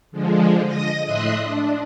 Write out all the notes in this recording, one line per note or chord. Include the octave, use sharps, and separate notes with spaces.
D3 F3 G#3
D#5 D#6 A#6
A2 D#5 E5 C6 D#6 F#6
D4